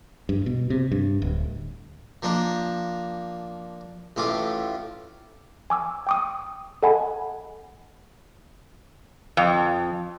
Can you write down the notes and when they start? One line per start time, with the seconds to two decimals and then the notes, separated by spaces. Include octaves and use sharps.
0.29 G2
0.46 B2
0.70 C3
0.92 G2
1.22 D1
2.22 F3 A#3 D4
4.16 A1 A2 F4 D6
5.70 G#5 D6 E6
6.07 G5 D6 D#6
6.83 A4 D#5 F#5 G#5 A5 B5
9.37 F2